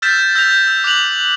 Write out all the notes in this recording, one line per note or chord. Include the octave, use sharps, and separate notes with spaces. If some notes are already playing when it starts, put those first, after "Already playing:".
E6 F6 G6 A6 B6 E7
E6 G6 A6 A#6 F7
E6
D6 F#6 G6 F7 F#7